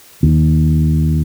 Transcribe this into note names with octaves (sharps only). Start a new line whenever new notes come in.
D#2